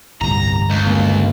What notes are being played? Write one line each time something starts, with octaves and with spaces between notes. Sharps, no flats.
D1 G1 C2 A#5
C#2
D2 A#3